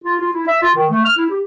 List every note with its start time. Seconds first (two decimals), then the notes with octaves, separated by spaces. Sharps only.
0.05 F4
0.20 F4
0.33 E4
0.48 E5
0.62 F4
0.75 D#3
0.91 A3
1.05 F6
1.17 E4
1.30 G4